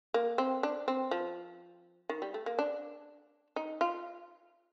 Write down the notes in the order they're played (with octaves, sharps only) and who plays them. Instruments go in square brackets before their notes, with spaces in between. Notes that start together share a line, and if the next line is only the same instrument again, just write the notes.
[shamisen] A#3
C4
D4
C4
F3
D#3
G3
A3
A#3
D4
D#4
F4